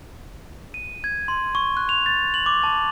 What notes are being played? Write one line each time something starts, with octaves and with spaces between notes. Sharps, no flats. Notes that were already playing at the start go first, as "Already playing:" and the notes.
D#7
G#6
C6
C#6
F#6
F7
A6
F#7
D6
A5